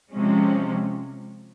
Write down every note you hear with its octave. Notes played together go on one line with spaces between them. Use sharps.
C3 F3 G#3 C#4